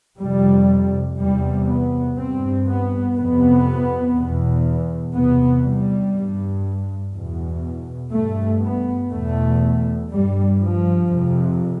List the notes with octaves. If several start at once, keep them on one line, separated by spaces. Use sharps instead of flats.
F2 C3 G3
E2 C3 G3
B3
G2 C4
B3
F2 C3 B3
E2 B2
E2 C3 B3
G3
G2
E2 B2
G2 A3
B3
E2 B2 A3
G2 G3
F3
F2 C3